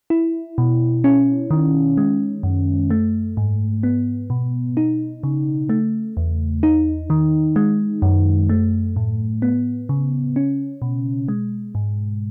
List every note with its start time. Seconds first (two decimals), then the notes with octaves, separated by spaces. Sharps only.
0.10 E4
0.58 B2
1.04 C#4
1.51 D#3
1.97 G#3
2.43 F#2
2.90 A3
3.37 G#2
3.83 B3
4.30 B2
4.77 D#4
5.23 C#3
5.69 A3
6.17 E2
6.63 D#4
7.10 D#3
7.56 G#3
8.02 F#2
8.49 A3
8.96 A2
9.42 B3
9.89 C#3
10.36 C#4
10.82 B2
11.28 G#3
11.75 G#2